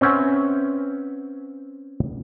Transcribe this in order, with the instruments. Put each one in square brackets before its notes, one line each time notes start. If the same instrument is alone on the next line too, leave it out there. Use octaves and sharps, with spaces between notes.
[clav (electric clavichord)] C4 C#4 B4 E5 F#5 G#5